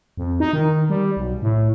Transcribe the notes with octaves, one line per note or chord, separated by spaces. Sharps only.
F2
D#4
D#3
G3
B1
A2